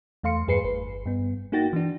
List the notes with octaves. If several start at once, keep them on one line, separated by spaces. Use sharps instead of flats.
E2 A3 F5 C6 C#7
E2 G2 G#4 B4 C7 C#7
G1 B4
G2 B3
A#3 D#4 F#4 G5 A6 A#6
E3 D4